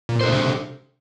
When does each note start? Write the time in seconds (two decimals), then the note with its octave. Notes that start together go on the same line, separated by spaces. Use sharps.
0.09 A#2
0.21 D4 A4 C5
0.33 C3